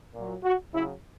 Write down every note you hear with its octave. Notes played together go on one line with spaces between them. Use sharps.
A#2 F#3
F#4
C#3 F#3 E4